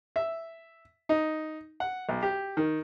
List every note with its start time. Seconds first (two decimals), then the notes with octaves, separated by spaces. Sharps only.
0.16 E5
1.09 D#4
1.80 F#5
2.09 B1
2.23 G4
2.57 D#3